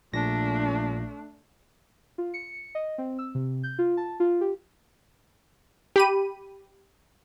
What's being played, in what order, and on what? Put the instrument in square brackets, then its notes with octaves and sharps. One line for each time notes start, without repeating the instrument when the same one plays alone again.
[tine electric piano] A#1 A#2 A#6 [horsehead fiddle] A3 D4
[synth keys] F4
C#7
D#5
C4
E6
C3
G6
F4
A5
F4
G4
[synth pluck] G4 B5 D#7